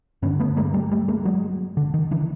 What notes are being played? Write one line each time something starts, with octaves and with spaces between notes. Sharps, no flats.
G2 D3 B3 C#4
A3 B3
G#3 A#3
G3 A3
G3 A3
G#3 A#3
F#3 G#3
D3
D#3
D3 E3